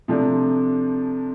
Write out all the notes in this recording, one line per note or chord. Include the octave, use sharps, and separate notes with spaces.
C3 F3 A3 D4